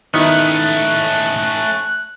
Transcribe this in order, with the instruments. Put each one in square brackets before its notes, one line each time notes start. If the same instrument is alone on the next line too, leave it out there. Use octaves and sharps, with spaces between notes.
[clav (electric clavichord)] D#3 B3 [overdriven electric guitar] A3 C#4 [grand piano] D#4 E4 [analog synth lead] F#6